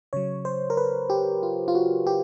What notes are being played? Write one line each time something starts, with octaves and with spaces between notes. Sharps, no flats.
C#3 F#3 C#5
C5
A#4
B4
G4
F4
F4
F#4
G4